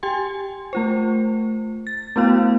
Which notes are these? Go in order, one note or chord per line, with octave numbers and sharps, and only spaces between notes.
G4 G5 G#5 C6
A3 F4 C5
A6
A3 B3 E4 F#4 F5